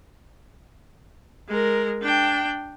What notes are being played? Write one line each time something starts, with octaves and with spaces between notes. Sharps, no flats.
G#3 A#4
D4 G5